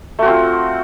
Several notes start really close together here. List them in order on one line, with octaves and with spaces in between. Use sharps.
A3 F#4 C4 F4